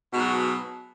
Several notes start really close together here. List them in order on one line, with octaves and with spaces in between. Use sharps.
B2 G#2 F#3